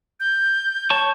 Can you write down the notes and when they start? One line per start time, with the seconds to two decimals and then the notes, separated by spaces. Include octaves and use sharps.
0.20 G6
0.90 C#5 A5 C#6